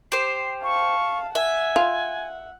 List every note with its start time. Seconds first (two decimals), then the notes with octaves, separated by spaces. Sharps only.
0.12 G4 C5 C7
0.63 F5 A5 C#6
1.35 E5 F#5 G#5
1.76 F4